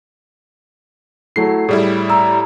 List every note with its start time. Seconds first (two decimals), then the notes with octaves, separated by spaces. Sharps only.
1.36 F#3 A3 E4 C7
1.69 A2 G3 E4 G#4
2.09 A#5 E6